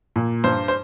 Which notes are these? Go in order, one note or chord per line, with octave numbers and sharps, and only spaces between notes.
A#2
G2 C5
C5